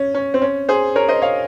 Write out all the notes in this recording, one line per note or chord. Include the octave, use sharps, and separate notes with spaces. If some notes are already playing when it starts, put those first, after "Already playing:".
Already playing: C#4
C#4
C4
C#4
G#4 C5
A#4 C#5
C5 D#5
C#5 F5